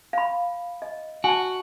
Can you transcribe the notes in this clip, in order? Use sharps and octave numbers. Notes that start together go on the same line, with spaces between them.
F5 B5
D#5
F#4 G#5 A5